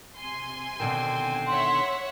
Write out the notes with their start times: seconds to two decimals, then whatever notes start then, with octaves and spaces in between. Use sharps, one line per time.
0.16 C3 G#5 C6
0.80 B2 D3 D#3 C4
1.47 C#5 E5 F#5 C6